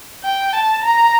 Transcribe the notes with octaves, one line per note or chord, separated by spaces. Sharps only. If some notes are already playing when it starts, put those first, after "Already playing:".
G5
A5
A#5